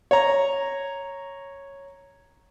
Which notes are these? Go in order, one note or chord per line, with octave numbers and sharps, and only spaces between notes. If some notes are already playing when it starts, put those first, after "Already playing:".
C#5 A#5